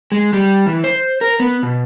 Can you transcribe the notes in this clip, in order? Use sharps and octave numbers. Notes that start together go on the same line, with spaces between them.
G#3
G3
E3
C5
A#4
B3
B2